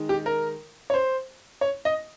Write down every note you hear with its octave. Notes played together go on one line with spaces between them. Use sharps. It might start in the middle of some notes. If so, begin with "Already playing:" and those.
Already playing: D#3 G#3 D#4
G4
A#4
C#5
C5
C#5
D#5